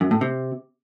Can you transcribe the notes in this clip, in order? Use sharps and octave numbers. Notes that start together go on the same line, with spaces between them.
F#2
A2
C3